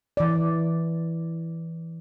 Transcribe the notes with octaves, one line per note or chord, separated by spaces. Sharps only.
E3 D5